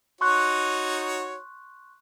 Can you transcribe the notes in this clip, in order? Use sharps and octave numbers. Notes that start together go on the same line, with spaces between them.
D#4 F#4 C#5 C6 C#6 F#6